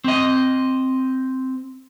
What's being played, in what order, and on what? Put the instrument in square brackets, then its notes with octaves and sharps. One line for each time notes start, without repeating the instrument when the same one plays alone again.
[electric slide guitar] C4 D#5